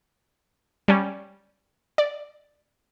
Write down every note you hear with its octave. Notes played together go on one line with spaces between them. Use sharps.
G3 C#4
D5